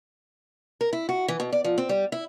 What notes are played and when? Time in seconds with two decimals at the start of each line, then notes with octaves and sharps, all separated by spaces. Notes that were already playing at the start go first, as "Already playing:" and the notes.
0.81 A#4
0.93 E4
1.09 F#4
1.28 E3
1.40 B2
1.52 D5
1.64 F3
1.78 C4
1.89 G3
2.12 E4